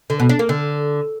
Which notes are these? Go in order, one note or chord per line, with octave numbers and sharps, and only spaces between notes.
D3
B2
D4
A#3
D3